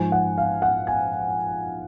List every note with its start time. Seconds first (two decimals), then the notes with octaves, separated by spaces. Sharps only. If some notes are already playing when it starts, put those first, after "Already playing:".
Already playing: G#2 F3 G#5
0.12 F#5
0.38 F5
0.62 F#5
0.87 G#5